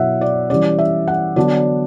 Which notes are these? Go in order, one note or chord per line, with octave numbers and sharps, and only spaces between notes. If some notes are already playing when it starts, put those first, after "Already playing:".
Already playing: B2 F#3 B3 E4 E5 F#5
D5
E3 G3 C#4 D5
E5
F#5
D3 F#3 B3 D4 D5